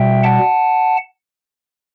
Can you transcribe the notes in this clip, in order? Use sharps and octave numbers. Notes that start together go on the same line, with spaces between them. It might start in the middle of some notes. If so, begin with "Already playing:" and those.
Already playing: B2 G3 E5 G5
F#5 A5